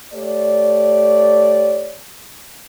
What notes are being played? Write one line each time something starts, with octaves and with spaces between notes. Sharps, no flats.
A3 G4 C#5 D5